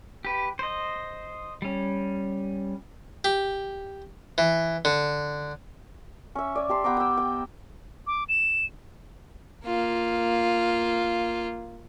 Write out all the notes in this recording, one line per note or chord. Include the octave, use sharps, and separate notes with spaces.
G4 B4
C5 D#5
G3 C#4
G4
E3
D3
C#4 E5
D5 G#5
G4 A5 C6
B3 G5 A#5 D6
G5 E6
G5
D6
E7
A#3 F4